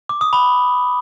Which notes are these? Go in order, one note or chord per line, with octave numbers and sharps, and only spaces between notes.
D6
D#6
B5